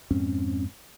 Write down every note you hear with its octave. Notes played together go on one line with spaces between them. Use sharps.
F2 G#2 C4 C#4